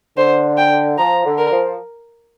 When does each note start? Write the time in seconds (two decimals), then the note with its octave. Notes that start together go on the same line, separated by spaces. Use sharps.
0.17 D3 C5
0.58 G5
0.98 F3 A#5
1.25 D3
1.38 A#4
1.52 F3